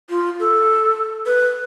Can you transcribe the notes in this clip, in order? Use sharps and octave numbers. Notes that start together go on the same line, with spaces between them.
F4
A4
B4